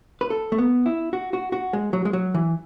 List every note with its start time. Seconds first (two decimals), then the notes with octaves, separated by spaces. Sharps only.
0.21 B4
0.30 A4
0.52 A3
0.58 B3
0.86 E4
1.13 F#4
1.33 F#4
1.52 F#4
1.73 G#3
1.93 F#3
2.05 G#3
2.13 F#3
2.34 E3